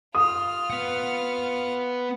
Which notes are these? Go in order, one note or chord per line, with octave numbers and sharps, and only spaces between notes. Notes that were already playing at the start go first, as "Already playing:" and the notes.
F4 D#6 F6
B3 F#5